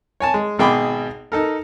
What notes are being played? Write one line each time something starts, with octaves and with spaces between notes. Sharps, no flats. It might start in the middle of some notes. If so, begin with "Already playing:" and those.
C#5 G#5 A5
G#3
G#1 B2 G#4 G5 B5 D6
D#4 A4 A#4